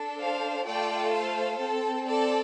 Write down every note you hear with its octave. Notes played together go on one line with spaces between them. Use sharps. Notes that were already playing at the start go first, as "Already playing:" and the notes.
Already playing: D4 A4
C5 F5
A3 F4 A4 D5 G5
C5 F5
C4 A4
A4 D5